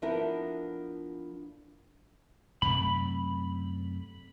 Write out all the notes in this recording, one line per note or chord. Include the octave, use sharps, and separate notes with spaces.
F3 B3 D4 E4 A4 A#4
F#2 C3 A3 B5